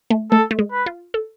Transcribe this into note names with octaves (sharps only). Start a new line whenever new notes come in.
A3
A3 A4
A3
G#3
B4
F4
A4